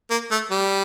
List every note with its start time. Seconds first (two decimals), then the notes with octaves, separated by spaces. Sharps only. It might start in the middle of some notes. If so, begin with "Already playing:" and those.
0.11 A#3
0.31 A3
0.51 G3